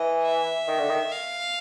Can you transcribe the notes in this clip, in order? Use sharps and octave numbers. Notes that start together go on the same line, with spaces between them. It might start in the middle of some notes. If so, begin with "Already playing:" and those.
Already playing: E3 D#5
E5
D#3
D3
D#3
F5